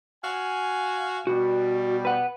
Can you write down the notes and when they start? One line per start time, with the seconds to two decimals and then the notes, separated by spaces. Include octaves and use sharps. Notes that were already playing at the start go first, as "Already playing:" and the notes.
0.24 F#4 F5 G#5
1.27 B2 G3 F#4
2.05 B4 F#5